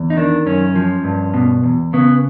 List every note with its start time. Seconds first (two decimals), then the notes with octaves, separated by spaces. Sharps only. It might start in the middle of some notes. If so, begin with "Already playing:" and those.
Already playing: E2
0.10 D#4
0.17 D#3 D4
0.46 F#2 C#4
0.76 F3
1.04 G2
1.34 B2
1.64 E2
1.93 C#3 B3